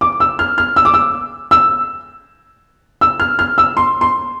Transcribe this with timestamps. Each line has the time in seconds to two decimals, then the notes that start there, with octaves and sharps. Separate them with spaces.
0.01 D6
0.20 E6
0.39 F6
0.58 F6
0.76 E6
0.85 D6
0.94 E6
1.51 E6
3.01 E6
3.20 F6
3.39 F6
3.58 E6
3.77 C6
4.01 C6